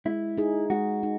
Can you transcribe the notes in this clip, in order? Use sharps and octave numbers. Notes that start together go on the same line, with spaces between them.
G#3 E4
D#4 G#4
G#3 F#4
D#4